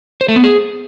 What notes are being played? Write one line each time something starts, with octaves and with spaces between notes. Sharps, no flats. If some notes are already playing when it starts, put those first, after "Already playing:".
C5
A3
B3
G#4